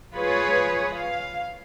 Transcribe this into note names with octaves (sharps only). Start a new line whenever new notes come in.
F4 G#4 B4 C#5
F5